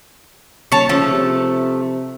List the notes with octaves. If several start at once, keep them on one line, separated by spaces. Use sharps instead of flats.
D#1 C#5 A5
C#3 F3 A3
C3